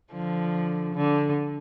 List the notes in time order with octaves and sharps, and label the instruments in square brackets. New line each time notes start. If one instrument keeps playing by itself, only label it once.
[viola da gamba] D3 F3
D3